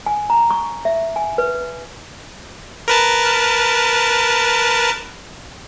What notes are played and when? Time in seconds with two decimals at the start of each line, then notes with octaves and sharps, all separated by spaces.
0.06 G#5
0.30 A#5
0.51 C#6
0.85 E5
1.16 G#5
1.38 B4
2.88 A#4 B4 A5